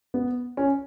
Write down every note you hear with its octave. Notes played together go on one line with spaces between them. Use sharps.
B3
C#4